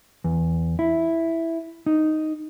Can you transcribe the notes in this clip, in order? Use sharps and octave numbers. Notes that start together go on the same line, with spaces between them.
E2
E4
D#4